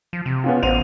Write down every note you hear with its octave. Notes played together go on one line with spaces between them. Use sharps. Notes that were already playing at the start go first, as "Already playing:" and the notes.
F3
C3
B3 C#4 F4
A1 C5 D#7 F7